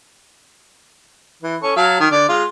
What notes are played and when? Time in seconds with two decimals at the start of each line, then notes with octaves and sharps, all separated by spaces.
1.42 E3
1.63 C#4 A4 C#6
1.76 F#3 F5 A5
2.00 D#3
2.11 D3 D5
2.29 G#3 F4